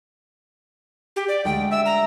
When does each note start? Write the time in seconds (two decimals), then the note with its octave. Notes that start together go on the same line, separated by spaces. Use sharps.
1.16 G4
1.28 D5
1.45 D2 G#3 G5 B6
1.71 E5 E6
1.85 A#5